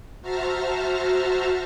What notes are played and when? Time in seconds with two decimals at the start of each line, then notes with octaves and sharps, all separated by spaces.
0.22 F#4 C5 E5 A5 A#5 F6